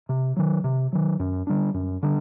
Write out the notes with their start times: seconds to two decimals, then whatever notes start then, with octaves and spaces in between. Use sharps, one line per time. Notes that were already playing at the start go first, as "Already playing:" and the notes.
0.09 C3
0.36 D#3 F#3
0.64 C3
0.93 D#3 F#3
1.20 F#2
1.47 D3 G3 D4
1.74 F#2
2.03 D3 G3 D4